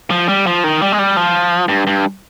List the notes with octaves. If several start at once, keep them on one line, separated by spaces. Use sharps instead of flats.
F3
G3
F3
D#3
G3
G#3
G3
F3
G2
G2